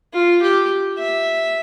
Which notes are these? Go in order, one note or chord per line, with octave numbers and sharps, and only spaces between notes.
F4
G4
E5